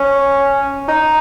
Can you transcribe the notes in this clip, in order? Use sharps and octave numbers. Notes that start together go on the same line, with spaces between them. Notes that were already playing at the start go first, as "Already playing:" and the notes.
Already playing: C#4
D#4